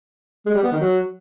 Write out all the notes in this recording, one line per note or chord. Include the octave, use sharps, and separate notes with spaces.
G#3
G3
B3
D#3
F#3